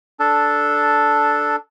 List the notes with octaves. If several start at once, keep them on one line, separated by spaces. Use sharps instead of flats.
D4 A4